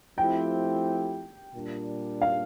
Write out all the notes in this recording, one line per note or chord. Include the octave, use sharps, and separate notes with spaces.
F3 A3 C4 E4 G4 G5
A#2 G3 D4
F5